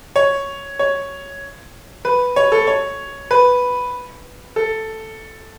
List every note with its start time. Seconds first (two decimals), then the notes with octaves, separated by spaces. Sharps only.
0.16 C#5
0.79 C#5
2.05 B4
2.36 C#5
2.52 A4
2.67 C#5
3.31 B4
4.56 A4